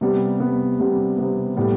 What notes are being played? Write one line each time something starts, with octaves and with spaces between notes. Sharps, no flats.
C3 G3 B3
C3 G3 B3
C3 G3 B3
C3 G3 B3
A2 G3 B3